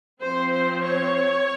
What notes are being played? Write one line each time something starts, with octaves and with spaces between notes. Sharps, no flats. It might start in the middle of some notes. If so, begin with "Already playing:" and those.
F3 C4 C5
C5
C#5